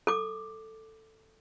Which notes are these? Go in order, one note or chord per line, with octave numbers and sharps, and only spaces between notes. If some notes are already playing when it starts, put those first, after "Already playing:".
A4 D6